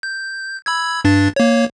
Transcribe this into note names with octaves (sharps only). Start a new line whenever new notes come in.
G6
B5 E6 G#6
G2 D4 A6
A#3 C#5